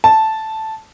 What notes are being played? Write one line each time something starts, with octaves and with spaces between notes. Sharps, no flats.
A5